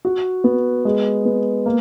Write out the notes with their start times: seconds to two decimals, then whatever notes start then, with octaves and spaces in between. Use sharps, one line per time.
0.05 F#4
0.44 B3
0.85 G#3
1.25 B3
1.66 A#3